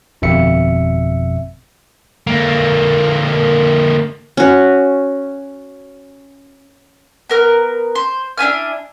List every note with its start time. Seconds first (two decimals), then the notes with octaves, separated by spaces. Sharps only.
0.22 G1 F2 B2 E5 C#7
2.27 D3 A#3
4.37 C#4 F#4
7.30 B3 A#4 F6
7.95 C5
8.38 D4 E4 G#5 F6